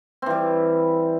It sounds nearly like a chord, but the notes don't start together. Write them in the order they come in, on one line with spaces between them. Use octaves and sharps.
C4 E3 G3